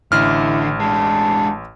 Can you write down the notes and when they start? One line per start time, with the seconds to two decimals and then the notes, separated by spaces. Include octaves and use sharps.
0.12 A1 D3 E4 F6
0.80 G#3 D4 A5